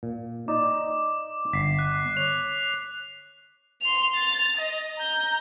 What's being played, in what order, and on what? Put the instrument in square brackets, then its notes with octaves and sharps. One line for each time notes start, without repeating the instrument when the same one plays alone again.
[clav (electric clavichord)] A#2
[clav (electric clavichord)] D#4 D5 D#5 [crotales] D6
[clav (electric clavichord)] G1 [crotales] B6 C7
[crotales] F#6
[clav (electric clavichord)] C#5 [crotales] F7
[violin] C6 F7
A6 F7
D#5
A#5 G6